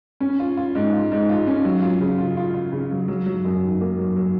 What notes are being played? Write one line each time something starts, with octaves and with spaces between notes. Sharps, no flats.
C#4
F4
F4
G#2
F4
G#2
F4
C#4
F#3
F4
C#3
F4
F4
F4
C#3
F#3
F#3
F#3
F#2
D#3
A#3
F#3
F#3